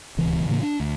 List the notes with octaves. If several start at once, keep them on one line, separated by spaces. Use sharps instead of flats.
D1 C#2 B2 E3
A2 C#3 E3 A#3
D4
D2